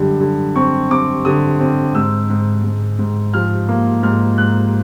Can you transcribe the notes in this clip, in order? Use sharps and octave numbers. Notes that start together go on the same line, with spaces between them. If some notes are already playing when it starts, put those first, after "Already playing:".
Already playing: F#2 D3 G3
D3
C4 C#6
C4 D6
D3 D#6
C4
G#2 E6
G#2
G#2
G#2
F3 F6
A#3
G#2 F6
G#2 F#6